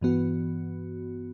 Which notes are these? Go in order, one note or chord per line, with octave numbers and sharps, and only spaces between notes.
G2 E3 B3 F#4